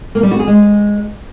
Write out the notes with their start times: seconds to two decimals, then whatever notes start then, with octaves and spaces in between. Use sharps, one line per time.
0.15 A#3
0.23 G3
0.31 F#4
0.39 G#4
0.48 G#3